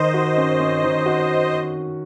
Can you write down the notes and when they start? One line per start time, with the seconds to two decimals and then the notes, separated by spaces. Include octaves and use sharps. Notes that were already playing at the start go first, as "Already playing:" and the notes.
Already playing: D#3 C5 D#5
0.14 F#4
0.38 C#4
0.60 C#4
0.83 D#3
1.06 F#4